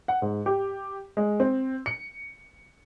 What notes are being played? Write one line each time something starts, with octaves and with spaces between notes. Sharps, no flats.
F#5
G#2
G4
G#3
C4
C#7